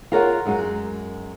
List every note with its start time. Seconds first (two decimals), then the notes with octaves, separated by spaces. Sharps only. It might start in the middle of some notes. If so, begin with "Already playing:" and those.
0.12 F4 G#4 A#4 C#5 F5 F#5
0.46 F#2 G#3 D#4 F#4